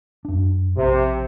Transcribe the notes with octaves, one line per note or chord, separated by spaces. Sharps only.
F#2 D4
A#1 C3